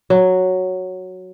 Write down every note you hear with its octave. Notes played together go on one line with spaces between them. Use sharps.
F#3